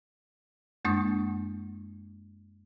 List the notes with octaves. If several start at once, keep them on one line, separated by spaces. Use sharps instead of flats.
F#2 G#3 A#3 D4 C#6 D#6